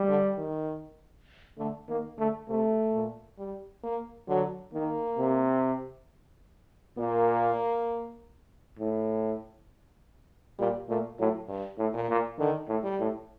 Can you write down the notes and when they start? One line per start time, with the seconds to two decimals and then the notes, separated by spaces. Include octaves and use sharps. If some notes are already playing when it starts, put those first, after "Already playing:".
Already playing: G3
0.08 D3
0.38 D#3
1.58 D3 A3
1.89 D#3 A#3
2.18 D3 A3
2.48 C3 A3
2.93 A#2
3.39 G3
3.84 A#3
4.28 D3 F#3
4.73 D#3 A#3
5.19 C3
6.98 A#2 A#3
8.79 A2
10.59 A#2 G3
10.89 A#2 A3
11.19 A2 F#3
11.48 G2
11.78 A2
11.94 A#2
12.09 A#2
12.39 D3 D#3
12.68 A2
12.84 G3
12.99 A2